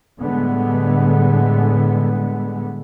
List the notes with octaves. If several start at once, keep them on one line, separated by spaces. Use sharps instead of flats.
A2 D3 G3 G#3 B3